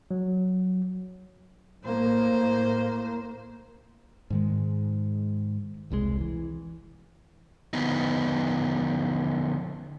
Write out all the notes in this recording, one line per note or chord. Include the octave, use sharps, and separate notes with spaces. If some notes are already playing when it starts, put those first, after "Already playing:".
F#3
A2 A#3 C5
G#2 D#3 G#3
E1 C2 A#2 G#3
E3
D3 F3 B3 D#4